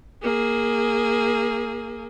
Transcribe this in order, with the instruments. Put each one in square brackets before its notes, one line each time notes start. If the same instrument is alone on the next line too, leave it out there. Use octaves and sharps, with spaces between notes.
[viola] A#3 G#4